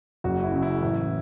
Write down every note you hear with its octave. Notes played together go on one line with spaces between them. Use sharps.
F#1 F#4
E4
F#2 C#3
E4
A1